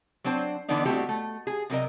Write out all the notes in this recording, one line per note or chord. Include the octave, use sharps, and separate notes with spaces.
F#3 C4 D4 C5
D3 E3 B3 D4 D#4
G3 A3 C4 E4 F#4 G4
A3
G#4
C3 F#3 A#4 D#5